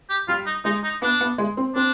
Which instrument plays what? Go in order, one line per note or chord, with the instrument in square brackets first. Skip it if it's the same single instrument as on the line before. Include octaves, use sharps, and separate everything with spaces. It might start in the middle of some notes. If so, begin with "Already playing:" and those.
[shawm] G4
[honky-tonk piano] G3 [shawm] F4
[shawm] D#4
[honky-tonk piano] G#3 [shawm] D#4
[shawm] D#4
[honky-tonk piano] B3 [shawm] D4
[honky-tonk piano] B3
G#3
C4
[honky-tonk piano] C4 [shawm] D4